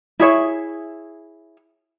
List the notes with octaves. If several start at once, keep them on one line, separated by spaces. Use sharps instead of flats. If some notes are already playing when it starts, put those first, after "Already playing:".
E4 G#4 C#5 E5